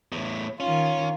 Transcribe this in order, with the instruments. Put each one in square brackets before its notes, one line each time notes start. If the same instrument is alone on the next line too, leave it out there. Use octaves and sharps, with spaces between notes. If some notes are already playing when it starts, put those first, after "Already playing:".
[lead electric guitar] E2 A2
[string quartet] D#3 F4 [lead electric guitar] C#4